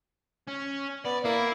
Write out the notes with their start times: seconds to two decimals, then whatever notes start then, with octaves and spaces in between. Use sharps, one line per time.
0.48 C#4
1.05 B3 D5
1.25 A#3 E4